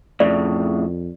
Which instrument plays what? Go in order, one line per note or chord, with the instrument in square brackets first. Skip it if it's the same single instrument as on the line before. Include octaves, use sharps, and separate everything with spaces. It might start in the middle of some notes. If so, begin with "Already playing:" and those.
[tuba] F2 [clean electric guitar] A2 C#3 [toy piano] D5